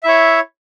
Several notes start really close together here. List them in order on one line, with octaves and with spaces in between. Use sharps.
E5 E4 C#5